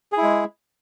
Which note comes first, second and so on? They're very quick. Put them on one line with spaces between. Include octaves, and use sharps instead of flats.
G#4 E4 G#3